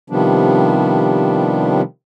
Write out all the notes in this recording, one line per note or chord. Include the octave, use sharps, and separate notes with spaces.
C3 D#3 F3 G3 B3 D4